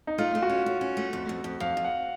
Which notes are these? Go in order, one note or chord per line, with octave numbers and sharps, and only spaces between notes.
D#4
A3 F4
A3
F#4
C#4
C#4
C#4
A3
F2
F2
F2
F2 F5
F2
F#5